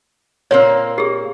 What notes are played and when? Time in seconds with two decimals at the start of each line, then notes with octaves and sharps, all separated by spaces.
0.51 A#2 A#3 C4 C#5
0.98 G4 G#4